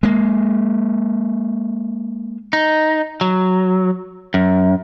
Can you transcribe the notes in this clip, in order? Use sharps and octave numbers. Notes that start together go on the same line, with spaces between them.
G#3 A#3
D#4
F#3
F#2